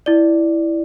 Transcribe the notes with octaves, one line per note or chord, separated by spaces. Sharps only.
E4 D5